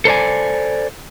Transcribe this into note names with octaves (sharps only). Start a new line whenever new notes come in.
A4 C5 D5 G#5